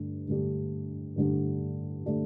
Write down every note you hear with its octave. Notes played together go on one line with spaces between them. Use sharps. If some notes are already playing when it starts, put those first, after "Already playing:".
Already playing: G2 D3 A3 D4
G2 D3 A3 D4 G4
G2 D3 A3 D4 G4
D3 A3 D4 G4